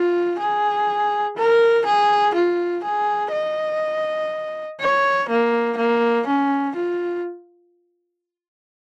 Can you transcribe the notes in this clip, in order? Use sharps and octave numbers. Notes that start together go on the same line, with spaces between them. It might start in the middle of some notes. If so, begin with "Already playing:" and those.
Already playing: F4
G#4
A#4
G#4
F4
G#4
D#5
C#5
A#3
A#3
C#4
F4